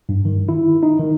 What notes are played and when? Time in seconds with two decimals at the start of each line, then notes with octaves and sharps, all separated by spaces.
0.09 G2
0.25 D#3
0.49 E4
0.83 D#4
0.99 D#3